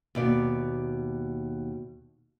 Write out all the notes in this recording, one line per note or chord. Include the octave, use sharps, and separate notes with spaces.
D#2 B2 D5